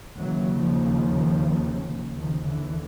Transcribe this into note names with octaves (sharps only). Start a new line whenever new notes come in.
D#2 C#3 E3 F#3
D#3 F3
D#2 C#3
D#3 F3
D3 E3